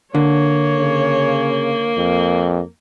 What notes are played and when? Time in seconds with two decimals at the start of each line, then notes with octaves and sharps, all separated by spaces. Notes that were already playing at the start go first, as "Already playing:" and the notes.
0.15 D3 A#3 C#5
0.78 C#3
1.98 F2